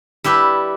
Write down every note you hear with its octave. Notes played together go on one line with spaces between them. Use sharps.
G3 E4 G4 B4